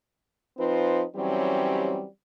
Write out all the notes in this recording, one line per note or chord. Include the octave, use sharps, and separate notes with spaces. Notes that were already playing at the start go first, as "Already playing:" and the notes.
F3 C4 D#4 F4 B4
E3 F#3 G3 C4 C#4 G4